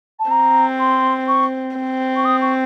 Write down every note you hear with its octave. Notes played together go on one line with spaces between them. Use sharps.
A5
C4 A#5
C6
C#6
C4
C#6
D#6
C#6